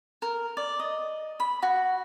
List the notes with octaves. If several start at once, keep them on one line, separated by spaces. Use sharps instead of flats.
A#4
D5
D#5
B5
F#4